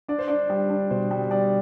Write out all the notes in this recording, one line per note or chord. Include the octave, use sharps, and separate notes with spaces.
D4 D5
C5
D4 D5
G3
D4
B2 C5
G3
G3 D5